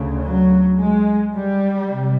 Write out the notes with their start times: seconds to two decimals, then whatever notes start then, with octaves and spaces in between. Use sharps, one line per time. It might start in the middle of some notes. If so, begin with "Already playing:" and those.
Already playing: D2 C#3
0.25 F#3
0.79 G#3
1.34 G3
1.88 C3